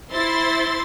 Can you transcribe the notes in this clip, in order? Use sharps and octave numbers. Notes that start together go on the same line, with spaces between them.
E4 C5 C6 A6